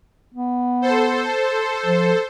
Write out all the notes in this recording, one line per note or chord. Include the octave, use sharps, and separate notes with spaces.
B3
A4 C5
F3